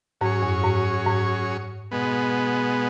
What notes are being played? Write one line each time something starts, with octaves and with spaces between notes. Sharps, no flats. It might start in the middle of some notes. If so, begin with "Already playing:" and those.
G#2 F#3 C#4 G#4 C#5
F#2
G#2
G#2
B2 G#3 B3